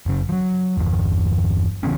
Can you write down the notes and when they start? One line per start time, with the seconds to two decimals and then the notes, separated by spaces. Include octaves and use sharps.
0.06 F#1 C#3
0.29 F3 F#3
0.77 G1 E2
1.83 C#3 E3 B3 C#4